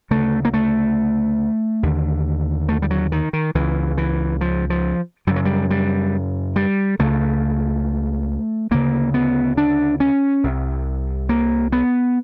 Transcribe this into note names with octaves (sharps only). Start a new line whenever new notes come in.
D2 C#3 A3
A#3
A3
D#2 D3
A3
G3
F#3
D#3
D#3
C#2 C#3 E3
E3
F3
F3
F#2 C#3 G3
F#3
G3
G3
G3
C#2 C#3 A3
D2 C#3 A#3
B3
D4
C#4
C2 C3
A#3
B3